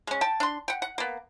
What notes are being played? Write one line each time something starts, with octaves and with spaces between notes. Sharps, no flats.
G#3 C#4
G5 A5
D4 C6
F#5 G5
F#5
A#3 B3